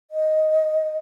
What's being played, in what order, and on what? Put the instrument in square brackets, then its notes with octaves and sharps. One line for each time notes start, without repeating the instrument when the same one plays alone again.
[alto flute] D#5